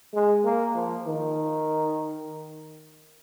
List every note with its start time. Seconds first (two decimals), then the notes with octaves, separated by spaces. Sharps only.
0.15 G#3
0.44 A#3
0.75 F3
1.06 D#3